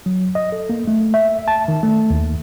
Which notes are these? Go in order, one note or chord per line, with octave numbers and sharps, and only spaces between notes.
F#3
D#5
A4
A#3
A3
E5
A5
D#3
A3
D#2